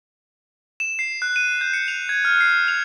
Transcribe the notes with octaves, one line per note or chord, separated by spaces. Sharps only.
E7
C7
F#6
D#7
G6
C#7
F7
G#6
F6
C7
F7